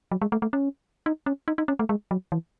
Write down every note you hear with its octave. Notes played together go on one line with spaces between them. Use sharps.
F#3
G#3
A3
A3
C#4
D#4
C#4
D#4
D#4
C#4
A3
G#3
F#3
E3